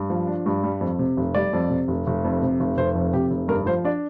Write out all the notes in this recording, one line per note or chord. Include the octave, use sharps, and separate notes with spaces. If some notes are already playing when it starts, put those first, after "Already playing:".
Already playing: G2
F3
D4
G2
G3
F2
C3
F1
G3 D5
F2
C3
F1
F1
F2
C3
F1
F1 C5
F2
C3 G4
F1
G2 A#4
F3 C5
D4 D5